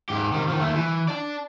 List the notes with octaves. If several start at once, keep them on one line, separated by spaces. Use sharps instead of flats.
G#2 G4
C3 D#3
D#3 F3
D#2 A3
E3
D5 A5